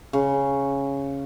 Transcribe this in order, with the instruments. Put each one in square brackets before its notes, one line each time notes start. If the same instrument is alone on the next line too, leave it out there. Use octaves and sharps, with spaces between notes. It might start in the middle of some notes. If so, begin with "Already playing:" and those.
[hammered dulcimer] C#3